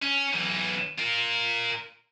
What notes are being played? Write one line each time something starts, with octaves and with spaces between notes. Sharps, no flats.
C#4
B1 E3
F4 A#4